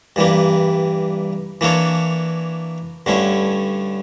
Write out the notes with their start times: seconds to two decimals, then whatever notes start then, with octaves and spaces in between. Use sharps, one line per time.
0.16 G2 E3 G3 A#3
1.61 E3 A#3 D4 A4 C#5
3.06 G2 D3 A3 C#4 E4